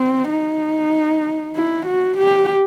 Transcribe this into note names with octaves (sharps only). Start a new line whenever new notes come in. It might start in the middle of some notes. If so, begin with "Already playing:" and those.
Already playing: C4
D#4
E4
F#4
G4